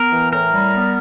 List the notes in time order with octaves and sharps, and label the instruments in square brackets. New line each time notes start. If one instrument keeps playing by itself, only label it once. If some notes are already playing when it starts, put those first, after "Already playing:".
Already playing: [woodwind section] B3 [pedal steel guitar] A#4
[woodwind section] E3
[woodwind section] A2 [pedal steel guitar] A#4
[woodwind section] G3
B3